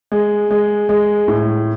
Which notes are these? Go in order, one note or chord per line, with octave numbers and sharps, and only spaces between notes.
G#3
G#3
G#3
A2